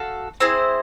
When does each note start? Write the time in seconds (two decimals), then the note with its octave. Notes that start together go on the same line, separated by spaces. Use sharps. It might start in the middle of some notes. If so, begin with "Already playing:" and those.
Already playing: F#4 A4 F5
0.40 C4 E4 G#4 C5